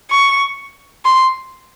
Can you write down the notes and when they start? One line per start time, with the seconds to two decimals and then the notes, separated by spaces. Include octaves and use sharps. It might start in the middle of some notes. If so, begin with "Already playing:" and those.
0.11 C#6
1.05 C6